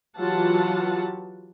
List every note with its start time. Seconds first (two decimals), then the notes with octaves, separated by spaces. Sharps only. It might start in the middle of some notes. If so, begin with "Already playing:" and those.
0.17 E3 F#3 F4 G4 F#5 A5